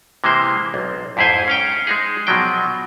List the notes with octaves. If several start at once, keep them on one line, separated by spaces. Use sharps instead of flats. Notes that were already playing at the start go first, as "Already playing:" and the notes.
C3 E3 G#3 A#3 C5
B1
F2 G#2 E4 G#4 C5 G#5
C#4 F5 G5
G#3 D#4 G#4
B2 F3 F#3 G5